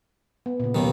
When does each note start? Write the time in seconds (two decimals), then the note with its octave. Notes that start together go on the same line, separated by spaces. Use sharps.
0.46 B3
0.60 A#2 C#3
0.75 D#2 B2 D#3 F#3 G4